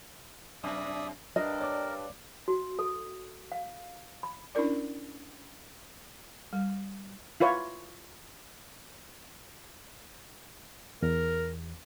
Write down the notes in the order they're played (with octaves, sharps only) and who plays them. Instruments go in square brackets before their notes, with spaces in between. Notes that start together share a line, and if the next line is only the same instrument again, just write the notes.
[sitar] F#2 C3 [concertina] D5 E5 D#6
[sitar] G2 D4 [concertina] A#4 [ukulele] D#5
[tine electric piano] C#5 D5 D6
[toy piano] F#4
A4
F5
B5
[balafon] C#4 D4 E4 A#4 D5
G3
[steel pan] E4 F4 B4 C#5
[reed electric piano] E2 [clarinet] A#4